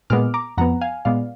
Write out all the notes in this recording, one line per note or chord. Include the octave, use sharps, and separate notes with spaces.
A#2 G#3 B3 D6 F6
A#5 D6
F2 F3 B3 F#5 A#5
F5 G#5
A#2 G#3 B3 D5 F5